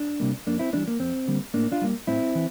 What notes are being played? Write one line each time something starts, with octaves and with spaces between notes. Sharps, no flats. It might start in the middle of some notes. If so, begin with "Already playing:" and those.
Already playing: D4
C3 G3 A#3
F2 A#3 D4
C4 E4
E3 G3 A#3 D4
A#3
F2 C4
D3 G3 A#3
A2 A#3 D4
D4 F4
G3 A#3
A2 C4 E4
E3